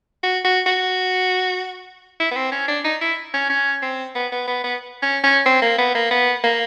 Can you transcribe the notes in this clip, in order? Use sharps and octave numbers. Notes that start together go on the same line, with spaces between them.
F#4
F#4
F#4
E4
B3
C4
C#4
D4
D#4
E4
C#4
C#4
C4
B3
B3
B3
B3
C#4
C#4
C4
A#3
B3
A#3
B3
A#3